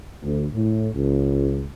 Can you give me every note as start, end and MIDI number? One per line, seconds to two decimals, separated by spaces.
0.23 0.46 38
0.53 0.89 45
0.94 1.67 37